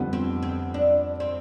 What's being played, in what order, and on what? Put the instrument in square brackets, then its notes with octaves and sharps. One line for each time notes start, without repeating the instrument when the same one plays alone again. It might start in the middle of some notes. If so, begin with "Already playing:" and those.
Already playing: [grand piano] F2 D3 G3 B3
[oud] C4
C4
D4
C4